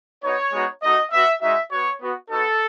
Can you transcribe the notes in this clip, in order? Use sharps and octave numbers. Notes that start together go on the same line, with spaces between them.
B3 D#4 F#4 C#5
G#3 B3 D#4 F#4
A3 D#4 F#4 D#5
B3 F#4 E5
G#3 D#4 F#4 E5
B3 F#4 C#5
B3 F#4
B3 D#4 F#4 A4